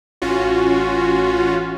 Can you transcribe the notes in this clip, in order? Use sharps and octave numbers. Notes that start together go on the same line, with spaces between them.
A1 C#4 F4 F#4